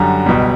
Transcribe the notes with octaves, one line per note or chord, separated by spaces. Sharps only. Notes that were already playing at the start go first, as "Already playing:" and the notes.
Already playing: F#2 D3 G3 A#5
C#2 B2 G3